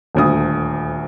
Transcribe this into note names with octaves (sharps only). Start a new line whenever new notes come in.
D#1 D2 D#6